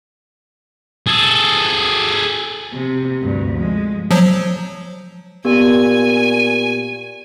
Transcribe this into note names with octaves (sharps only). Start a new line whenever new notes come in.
G#4 A4
C3
D2 G2
F3 G#3
F3 F#3
A#2 B3 G4 G#5